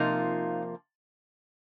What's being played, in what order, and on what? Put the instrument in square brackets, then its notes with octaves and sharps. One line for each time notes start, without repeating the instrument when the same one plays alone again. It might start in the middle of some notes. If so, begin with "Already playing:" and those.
Already playing: [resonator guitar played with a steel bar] C3 F3 A#3 D#4 F4